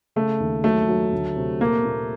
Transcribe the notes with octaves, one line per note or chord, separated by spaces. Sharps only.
C#3 A3
D#2
F#3 A3
F#3
D2
C3
A#2 A#3
A#2